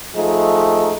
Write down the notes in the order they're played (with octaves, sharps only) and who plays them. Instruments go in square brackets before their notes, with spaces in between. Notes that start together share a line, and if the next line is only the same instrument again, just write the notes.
[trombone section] F3 G#3 A3 D#4